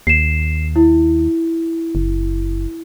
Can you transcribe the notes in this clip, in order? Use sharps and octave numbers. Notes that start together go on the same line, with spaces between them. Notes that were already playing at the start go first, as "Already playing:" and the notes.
D#2 C7 E7
E4
F#1